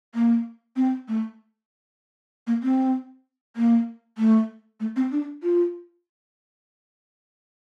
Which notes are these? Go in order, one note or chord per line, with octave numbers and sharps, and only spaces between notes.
A#3
C4
A3
A#3
C4
A#3
A3
A3
C4
D4
F4